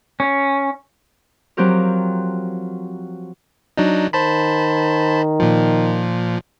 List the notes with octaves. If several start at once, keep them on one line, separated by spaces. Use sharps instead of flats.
C#4
F3 F#3 C4 G4 A#4
F#3 D4 D#4
D#3 C5 A5 B5
A#2 F3